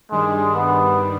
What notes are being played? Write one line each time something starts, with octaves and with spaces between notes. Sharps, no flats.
G2 D#3 G3 G#3 D4
B3